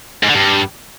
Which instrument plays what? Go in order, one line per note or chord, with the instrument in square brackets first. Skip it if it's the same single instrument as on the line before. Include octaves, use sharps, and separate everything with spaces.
[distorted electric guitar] G#2
D3
G2